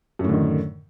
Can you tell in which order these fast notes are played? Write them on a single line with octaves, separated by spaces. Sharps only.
F#2 A2 D3 D#3